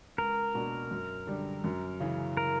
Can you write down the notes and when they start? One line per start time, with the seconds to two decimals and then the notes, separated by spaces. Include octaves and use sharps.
0.18 C#2 A#4
0.54 B2 A#3 D4 F#4
0.91 F#2
1.27 D3 G3
1.64 F#2
2.00 C#3 E3
2.37 A#4